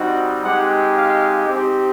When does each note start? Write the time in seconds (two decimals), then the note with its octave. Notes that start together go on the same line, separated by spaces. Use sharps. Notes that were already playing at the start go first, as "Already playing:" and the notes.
Already playing: G3 C4 D#4 F#4
0.43 G#3 C4 D#4 G4 F#5
0.96 F5
1.49 C4 D#4 G4